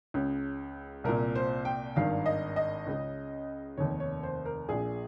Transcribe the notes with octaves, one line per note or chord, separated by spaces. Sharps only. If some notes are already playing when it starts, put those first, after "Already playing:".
C#2 C#3
C2 A#2 A#4
C5
G5
G#1 G2 D#3 F5
D#5
D#5
C#2 C#3
F1 D#2 D#3 C#5
C#5
C5
A#4
A#1 A#2 G#4